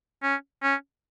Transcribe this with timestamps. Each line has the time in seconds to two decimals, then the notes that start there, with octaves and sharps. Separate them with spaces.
0.23 C#4
0.63 C#4